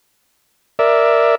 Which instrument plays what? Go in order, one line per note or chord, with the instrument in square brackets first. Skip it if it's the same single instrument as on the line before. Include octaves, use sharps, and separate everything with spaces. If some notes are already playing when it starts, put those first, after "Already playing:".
[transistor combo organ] A#4 D5 E5